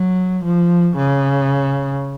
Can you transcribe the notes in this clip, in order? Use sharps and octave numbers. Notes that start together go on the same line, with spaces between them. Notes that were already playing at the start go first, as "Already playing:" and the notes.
Already playing: F#3
F3
C#3